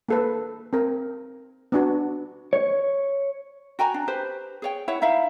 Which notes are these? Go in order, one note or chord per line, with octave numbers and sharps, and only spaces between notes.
A#3 A4 B4
C4 A#4
B3 D4 F#4
C#5
F#4 G5 G#5 A#5
D4
G4 B4 C5
G#4 C#5 G5
E4 C#5 E5 F#5
D#4 E4 E5 F5